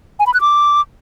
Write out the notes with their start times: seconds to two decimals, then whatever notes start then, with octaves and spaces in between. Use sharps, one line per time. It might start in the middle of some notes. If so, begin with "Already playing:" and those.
0.20 G#5
0.27 B5
0.34 F#6
0.41 D6